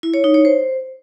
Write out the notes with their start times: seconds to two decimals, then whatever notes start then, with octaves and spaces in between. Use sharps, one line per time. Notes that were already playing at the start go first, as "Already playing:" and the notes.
0.03 E4
0.14 C#5
0.24 D#4
0.34 C#5
0.45 C5